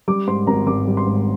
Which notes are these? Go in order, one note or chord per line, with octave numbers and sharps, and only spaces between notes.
G3 D6
G#2 C6
G#1 A#5
G#1 D6
G3
C6
G#2